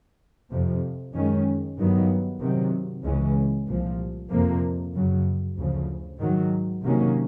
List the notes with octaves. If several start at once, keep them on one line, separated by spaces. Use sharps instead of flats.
F2 C3 F3
F#2 D#3 G#3 C#4
G2 D#3 F#3 B3
C3 D#3 F#3
C#2 C#3 E3 G#3 C#4
C2 A#2 F3
F2 C3 F3 A#3
F#2 C#3 F#3
D2 C#3 F3
G#2 D#3 F#3
C3 D#3 F#3 A#3 C#4